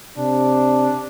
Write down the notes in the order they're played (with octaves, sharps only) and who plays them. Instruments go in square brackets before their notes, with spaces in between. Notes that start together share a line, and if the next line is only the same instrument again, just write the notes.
[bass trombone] C3 [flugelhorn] D4